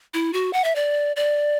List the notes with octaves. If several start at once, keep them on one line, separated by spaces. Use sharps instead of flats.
E4
F#4
F#5
E5
D5
D5